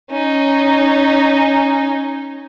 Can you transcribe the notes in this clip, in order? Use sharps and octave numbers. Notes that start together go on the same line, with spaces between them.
C#4 D#4